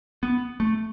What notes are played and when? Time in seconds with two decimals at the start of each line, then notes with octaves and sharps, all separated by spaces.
0.23 B3
0.60 A3